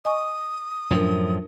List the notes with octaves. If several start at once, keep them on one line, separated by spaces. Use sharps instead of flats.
D#5 G#5 C#6 D#6
F#2 A2 F3 D4 A#4